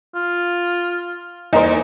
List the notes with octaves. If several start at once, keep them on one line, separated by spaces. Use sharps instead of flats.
F4
E2 A#3 D#4 A#4 C5